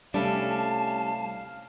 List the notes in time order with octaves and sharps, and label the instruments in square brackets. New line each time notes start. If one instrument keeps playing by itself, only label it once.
[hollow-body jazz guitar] C2 A3 D4 [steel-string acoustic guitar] G3 C#4 [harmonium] F5 [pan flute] A5